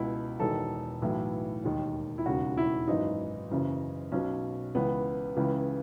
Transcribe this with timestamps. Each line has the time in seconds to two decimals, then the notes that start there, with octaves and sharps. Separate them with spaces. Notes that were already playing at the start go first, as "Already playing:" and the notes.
Already playing: C#2 B2 E4
0.40 E1 E2 D#3 A4
1.02 B1 A2 E3
1.64 E1 D#2 D#3
2.18 E4
2.26 E1 D#2 C#3 F#4
2.57 E4
2.88 G#1 F#2 E3 D#4
3.50 F#1 F#2 C#3 E3
4.12 B1 B2 C#4
4.75 C#2 C#3 E3 B3
5.36 C#2 C#3 E3